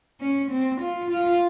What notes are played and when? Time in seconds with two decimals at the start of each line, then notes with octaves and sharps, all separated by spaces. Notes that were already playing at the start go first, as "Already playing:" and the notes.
0.21 C#4
0.51 C4
0.81 F4
1.11 F4